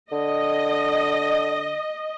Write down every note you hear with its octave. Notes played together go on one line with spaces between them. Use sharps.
D3 D#5